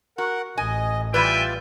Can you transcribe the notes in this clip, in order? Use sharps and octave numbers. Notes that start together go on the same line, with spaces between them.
F#4 A#4 F#5
A1 D#5 G#5
E3 G3 F4 B4 D5 E5 G5 G#5